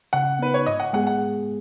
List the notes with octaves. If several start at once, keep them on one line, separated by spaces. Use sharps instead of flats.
C#3 F#5
B3 D#4 B4
C#5
G#2 D#5
F#5
G#3 B3 G#4 F#5
F#5